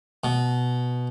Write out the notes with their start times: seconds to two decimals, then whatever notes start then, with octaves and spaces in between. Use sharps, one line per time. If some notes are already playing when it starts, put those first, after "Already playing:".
0.24 B2